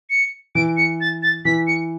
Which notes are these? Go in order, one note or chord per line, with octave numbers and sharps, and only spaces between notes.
C#7
E3 D7
C#7
A6
A6
E3 B6
C#7